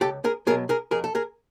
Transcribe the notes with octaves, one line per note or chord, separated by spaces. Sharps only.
C#2 G4 A4
G#4 A#4
B2 F#3 B3 G#4 A#4
G#4 A#4
F2 G#4 A#4
A4
G#4 A#4